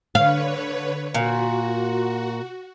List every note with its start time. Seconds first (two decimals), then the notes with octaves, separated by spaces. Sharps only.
0.15 D3 B4 C#5 F5
1.14 A#2 F#4